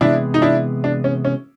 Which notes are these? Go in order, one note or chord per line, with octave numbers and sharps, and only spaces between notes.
C3 E3 G#3 B3 D4 E4
D#4
D4 E4
D4
C#4
C#4